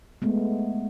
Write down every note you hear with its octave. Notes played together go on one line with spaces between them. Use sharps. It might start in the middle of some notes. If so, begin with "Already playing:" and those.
G#3 A3 B3